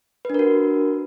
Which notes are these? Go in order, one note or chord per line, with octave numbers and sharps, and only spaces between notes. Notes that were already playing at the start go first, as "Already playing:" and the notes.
D4 F#4 A#4 B4